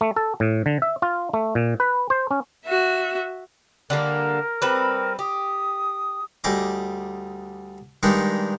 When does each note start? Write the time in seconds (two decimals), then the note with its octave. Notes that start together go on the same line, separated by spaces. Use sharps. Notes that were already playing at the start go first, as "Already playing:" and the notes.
0.01 A3
0.16 A4
0.40 A2
0.66 D3
0.82 E5
1.02 F4
1.33 A3
1.55 A#2
1.80 B4
2.10 C5
2.31 C#4
2.66 F#4 E5
3.90 D3 G3 A#3 A#4
4.62 G3 C4 B4
5.19 G4 D#6
6.44 D2 G3 G#4 D#5 D6
8.03 G2 D#3 G#3 D4 D#4